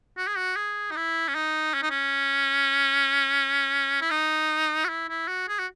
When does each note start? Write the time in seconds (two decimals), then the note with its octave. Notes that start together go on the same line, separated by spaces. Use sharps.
0.17 F#4
0.27 G#4
0.37 F#4
0.56 G#4
0.91 D#4
0.96 E4
1.28 C#4
1.35 D#4
1.74 C#4
1.82 D#4
1.91 C#4
4.01 E4
4.11 D#4
4.85 F#4
4.89 E4
5.09 E4
5.28 F#4
5.48 G#4
5.59 F#4